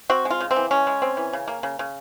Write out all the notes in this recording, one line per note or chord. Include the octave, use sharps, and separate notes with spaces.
C4 F#4
G#3
F4
C#3
C4
E3
G#3 C#4
G#3
C4
E3
C#3
A#3
C#3
C#3